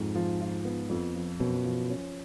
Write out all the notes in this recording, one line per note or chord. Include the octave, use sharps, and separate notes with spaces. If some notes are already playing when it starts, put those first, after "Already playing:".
Already playing: F2 G#2
F3
F4
B3
F2
F3
F#2 B2
F3
C#4